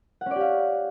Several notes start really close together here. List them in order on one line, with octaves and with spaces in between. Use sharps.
F#5 C#4 D5 G4 F5